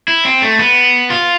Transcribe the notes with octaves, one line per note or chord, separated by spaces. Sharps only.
E4
C4
A3
B3
F4